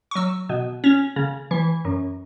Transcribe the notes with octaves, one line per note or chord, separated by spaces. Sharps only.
C#6
F#3 E6
B2
C#4
C#3
E3
F#2